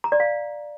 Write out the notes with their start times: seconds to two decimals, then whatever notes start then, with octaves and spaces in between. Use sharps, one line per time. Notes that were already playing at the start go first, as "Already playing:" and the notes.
0.04 A#5
0.12 D5
0.20 F5